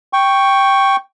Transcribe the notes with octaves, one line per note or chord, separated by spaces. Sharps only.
G5 C#6